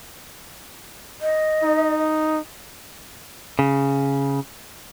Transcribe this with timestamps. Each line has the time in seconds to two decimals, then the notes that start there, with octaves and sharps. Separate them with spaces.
1.21 D#5
1.63 D#4
3.59 C#3